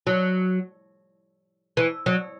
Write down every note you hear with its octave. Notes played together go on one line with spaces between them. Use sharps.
F#3
E3
F#3